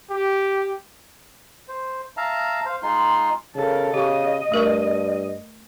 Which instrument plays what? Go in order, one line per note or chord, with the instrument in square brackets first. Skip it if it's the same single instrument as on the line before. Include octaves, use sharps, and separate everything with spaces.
[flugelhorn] G4
[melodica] C5
E5 F5 A5 A#5
C5 F5
G#3 D#4 F4 C6
[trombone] C#3 [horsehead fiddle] A4 A#4
[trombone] C#3 [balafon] G4 C#6 [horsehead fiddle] D#5
[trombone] G2 [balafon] A3 A#4 C#6